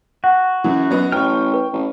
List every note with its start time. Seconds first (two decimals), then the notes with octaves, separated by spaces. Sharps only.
0.24 F#4 F#5
0.64 F#2 E3
0.91 F#3 B3 D#4
1.12 A1 G5 A5 C#6 F6
1.54 B4
1.73 A1